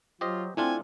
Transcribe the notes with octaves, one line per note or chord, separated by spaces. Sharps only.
F#3 F4 G4 C5 D#5
A3 C4 D4 E4 F4 G#5